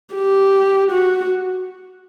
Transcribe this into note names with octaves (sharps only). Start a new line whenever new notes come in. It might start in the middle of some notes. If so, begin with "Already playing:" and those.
G4
F#4